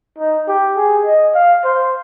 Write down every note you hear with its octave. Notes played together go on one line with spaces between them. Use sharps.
D#4
G4
G#4
D#5
F5
C5